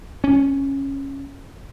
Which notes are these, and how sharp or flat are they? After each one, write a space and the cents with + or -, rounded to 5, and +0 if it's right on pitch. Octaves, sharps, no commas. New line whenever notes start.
C#4 -10